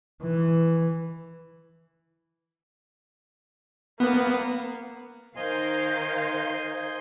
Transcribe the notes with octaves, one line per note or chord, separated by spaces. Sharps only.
E3
A#3 B3
D#3 A#4 C5 D#5 F5 G#5 C6